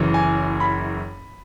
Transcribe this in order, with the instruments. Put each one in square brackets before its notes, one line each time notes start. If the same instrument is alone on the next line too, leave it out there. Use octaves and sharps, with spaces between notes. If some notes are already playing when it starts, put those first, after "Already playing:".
Already playing: [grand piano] F#1 F#2 E3
G#5
B5